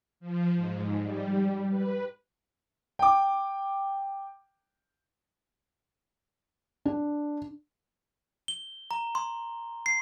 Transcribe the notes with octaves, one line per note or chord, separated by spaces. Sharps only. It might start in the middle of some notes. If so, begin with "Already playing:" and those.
F3
G#2
G3
B4
G5 D6
D4
G7
A#5
C6
C7